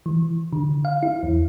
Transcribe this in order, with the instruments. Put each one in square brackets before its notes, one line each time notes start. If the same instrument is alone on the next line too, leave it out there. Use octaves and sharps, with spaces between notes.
[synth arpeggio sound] E3
D3
F5
E4
E2